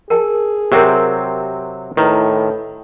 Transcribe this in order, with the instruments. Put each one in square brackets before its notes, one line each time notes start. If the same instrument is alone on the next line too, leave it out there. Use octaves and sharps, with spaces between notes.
[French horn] G#4 [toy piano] A#4 G5 A5
[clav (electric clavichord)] C3 F#3 C4 [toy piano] G4 A#4
[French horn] A2 [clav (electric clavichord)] D#3 [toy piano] E4 B4